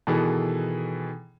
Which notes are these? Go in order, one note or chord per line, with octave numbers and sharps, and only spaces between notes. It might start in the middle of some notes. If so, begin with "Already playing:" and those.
B2 D#3 E3 G#4 A4